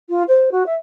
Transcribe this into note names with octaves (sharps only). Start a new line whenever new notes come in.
F4
C5
F#4
E5